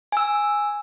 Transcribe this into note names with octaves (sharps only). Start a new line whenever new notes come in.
G#5 E6